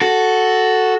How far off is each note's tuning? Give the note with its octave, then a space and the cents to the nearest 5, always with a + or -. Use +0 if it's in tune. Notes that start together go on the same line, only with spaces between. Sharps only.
F#4 +0 A4 +0